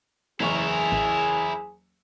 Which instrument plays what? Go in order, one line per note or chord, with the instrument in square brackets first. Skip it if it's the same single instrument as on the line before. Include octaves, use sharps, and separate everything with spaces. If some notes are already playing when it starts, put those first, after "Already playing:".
[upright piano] F#1 E2 C#6 [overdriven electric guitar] E4 A#4 [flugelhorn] G#4
[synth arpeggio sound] A1